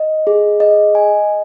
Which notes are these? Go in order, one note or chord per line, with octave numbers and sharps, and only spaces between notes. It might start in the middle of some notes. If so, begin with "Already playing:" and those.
Already playing: D#5
G#4
D#5
G#5